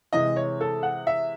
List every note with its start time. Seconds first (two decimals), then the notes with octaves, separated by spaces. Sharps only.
0.13 C3 E3 G#3 D#5
0.36 C#5
0.61 A4
0.83 F#5
1.07 E5